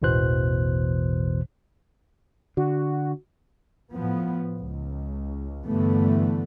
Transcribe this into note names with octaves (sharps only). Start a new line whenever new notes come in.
A1 E2 B2 E3 C5 F#6
D3 F#4
A2 F3 B3
C#2
G2 D3 E3 A3 B3